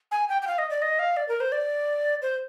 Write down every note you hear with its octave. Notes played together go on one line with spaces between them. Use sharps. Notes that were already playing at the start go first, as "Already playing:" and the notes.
G#5
G5
G5
F5
D#5
D5
D#5
F5
D5
A#4
C5
D5
C5